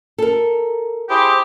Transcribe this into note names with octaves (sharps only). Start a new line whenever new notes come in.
A4 A#4
E4 G4 G#4 C5